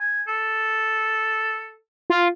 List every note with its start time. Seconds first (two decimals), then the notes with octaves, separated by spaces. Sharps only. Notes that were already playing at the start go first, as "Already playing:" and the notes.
0.01 G#5
0.28 A4
2.10 F4